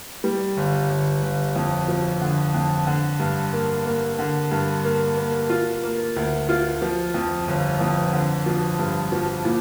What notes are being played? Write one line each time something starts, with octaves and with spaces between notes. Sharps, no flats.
G3
G1
G1
G1
F2
F3
D3
F2
D3
G2
A#3
A#3
D3
G2
A#3
A#3
F4
A#3
D2
F4
F3
F2
G1
F2
D3
F3
G2
F3
A#2